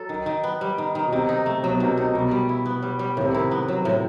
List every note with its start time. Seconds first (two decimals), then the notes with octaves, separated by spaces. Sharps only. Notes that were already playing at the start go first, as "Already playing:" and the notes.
Already playing: F#3 A4
0.09 D#3
0.26 D#3
0.44 B3
0.61 G3
0.78 D#3
0.95 D#3
1.06 B2
1.12 C3 D#3
1.29 D#4
1.46 A3
1.63 B2 F#3
1.80 C3 D#3
1.89 B2
1.97 D#4
2.14 B2 G3
2.31 G3
2.49 E4
2.66 B3
2.82 G3
2.99 G3
3.17 A2 D#3
3.24 C3
3.31 D#3 E4
3.51 B3
3.68 F#3
3.85 A2